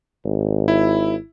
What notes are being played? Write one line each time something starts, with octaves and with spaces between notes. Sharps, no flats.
G#1
E4